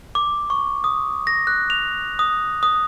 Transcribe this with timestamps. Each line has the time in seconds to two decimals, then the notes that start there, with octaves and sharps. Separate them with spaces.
0.15 D6
0.50 C#6
0.84 D#6
1.27 A#6
1.47 F#6
1.70 F7
2.19 D#6
2.63 D#6